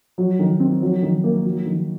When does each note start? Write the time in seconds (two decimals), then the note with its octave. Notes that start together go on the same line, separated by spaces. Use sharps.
0.18 F#3
0.39 D#3
0.60 C4
0.82 F#3
1.02 D#3
1.24 A#3
1.45 F#3
1.66 D#3